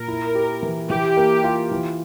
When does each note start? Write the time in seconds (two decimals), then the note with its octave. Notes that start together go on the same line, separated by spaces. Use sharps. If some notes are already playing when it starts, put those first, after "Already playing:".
Already playing: A#2 A#4
0.08 E4
0.35 G4
0.63 E3
0.89 E3 G4
1.17 A#3
1.44 F4
1.72 E3